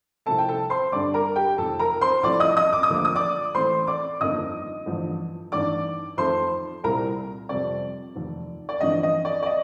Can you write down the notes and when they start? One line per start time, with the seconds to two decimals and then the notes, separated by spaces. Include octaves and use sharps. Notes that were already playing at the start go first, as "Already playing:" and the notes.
0.26 C2 C3 F3 A3 C4 A4 A5
0.38 G5
0.49 A4 A5
0.70 C5 C6
0.92 G2 D3 G3 D5 D6
1.14 A#4 A#5
1.36 G4 G5
1.57 F1 F2 D#3 A4 A5
1.79 A#4 A#5
2.01 C5 C6
2.23 C2 C3 F3 A3 D5 D6
2.40 D#5 D#6
2.57 D#5 D#6
2.73 D6
2.83 D#6
2.90 D2 D3 F3 A#3 D6
3.05 D#6
3.15 D5 D6
3.55 A1 A2 A3 C4 C5 C6
3.87 D5 D6
4.20 G1 F2 D#3 A#3 D#5 D#6
4.86 A1 G2 D3 F3
5.52 A1 G2 D#3 D5 D6
6.17 F2 D#3 A3 C4 C5 C6
6.84 C2 A#2 G3 C4 A#4 A#5
7.49 F2 C3 G3 C4 D5
8.15 F1 D#2 D#3
8.69 D5
8.81 A1 G2 D3 F3 C4 D#5
9.03 D#5
9.25 D5
9.43 D5
9.46 D#5